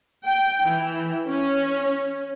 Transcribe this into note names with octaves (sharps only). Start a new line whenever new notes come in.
G5
E3
C#4